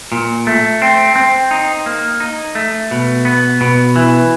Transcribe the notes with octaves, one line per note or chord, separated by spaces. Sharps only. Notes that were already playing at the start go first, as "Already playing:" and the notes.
A#2
A3
C4
C4
D#4
A#3
D#4
A3
B2
B3
B2
E3